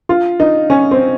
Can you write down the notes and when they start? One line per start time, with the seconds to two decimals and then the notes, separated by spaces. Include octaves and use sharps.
0.09 F4
0.40 D#4
0.70 C#4
0.91 C4